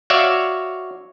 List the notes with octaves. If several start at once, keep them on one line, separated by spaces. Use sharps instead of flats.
F#4 C#5 D5 E5 F5